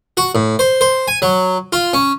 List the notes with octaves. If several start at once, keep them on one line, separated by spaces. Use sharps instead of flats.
F#4
A2
C5
C5
G#5
F#3
F4
C#4